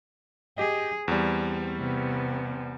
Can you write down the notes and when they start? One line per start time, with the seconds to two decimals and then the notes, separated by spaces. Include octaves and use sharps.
0.58 G4 G#4 D#5
1.08 E2 G3 C4
1.79 C3 B3